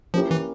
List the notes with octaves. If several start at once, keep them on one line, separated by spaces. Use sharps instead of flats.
F3 A#3 C#4 E4 G4 A#4
E3